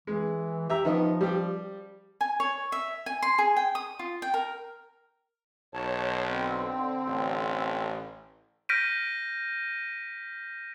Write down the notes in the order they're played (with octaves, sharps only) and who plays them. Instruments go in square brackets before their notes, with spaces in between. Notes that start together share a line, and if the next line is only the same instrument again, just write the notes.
[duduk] E3 [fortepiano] G#3
[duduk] G4 [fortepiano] E5 A#5
[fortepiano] D#3 B3 D#5 [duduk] F3
[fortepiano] G3 G4
[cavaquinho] G#5
C#5
E5
G#5
C6
G#4
G5
D#6
F4
G5
A#4
[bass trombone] B1 [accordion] C#5 A5
[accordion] D3 C4
[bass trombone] A1
[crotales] F6 G6 A#6 B6 D7 D#7